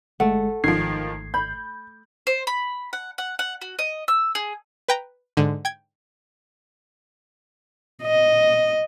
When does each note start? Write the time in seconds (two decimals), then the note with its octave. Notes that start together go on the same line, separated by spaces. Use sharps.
0.20 G1 G#3 A3 F#5
0.64 G#1 D#3 F3 G#6 C7
1.34 B5 G6
2.27 C5
2.47 B5
2.93 F#5
3.18 F#5
3.39 F#5
3.61 F#4
3.79 D#5
4.08 E6
4.35 G#4
4.88 B4 G5 A#5
5.37 G#2 D3
5.65 G5 G#6
8.03 D#5